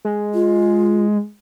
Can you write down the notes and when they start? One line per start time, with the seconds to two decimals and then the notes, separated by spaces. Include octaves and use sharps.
0.05 G#3
0.34 F4